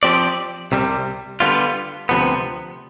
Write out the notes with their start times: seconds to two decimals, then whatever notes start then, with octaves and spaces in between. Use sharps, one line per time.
0.03 F3 C4 G4 D5
0.72 C2 C3 G3
1.40 D3 G3 B3 F4
2.09 D2 C3 F3 B3